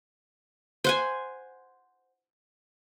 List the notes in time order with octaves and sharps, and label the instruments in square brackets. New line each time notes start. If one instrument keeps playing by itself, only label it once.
[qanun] C5 F#5 G#5